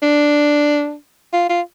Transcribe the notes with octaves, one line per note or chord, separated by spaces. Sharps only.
D4
F4
F4